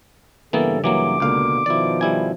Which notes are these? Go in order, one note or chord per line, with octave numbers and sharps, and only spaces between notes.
G2 C#3 E3 A#3 B3 A4
E3 F#3 A#3 D6
C#2 B2 D3 A#3 F5
B2 D#3 F3 E4 D5
G3 E4 G#5